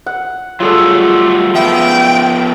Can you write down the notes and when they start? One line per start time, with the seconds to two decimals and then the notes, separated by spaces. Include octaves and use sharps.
0.06 F#5
0.60 F#3 G3 A3 F4 G#4 A4
1.55 F3 B3 E5 G5 G#5